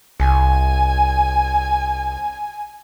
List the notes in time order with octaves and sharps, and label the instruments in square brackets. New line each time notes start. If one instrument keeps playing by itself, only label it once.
[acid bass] C2 [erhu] G#5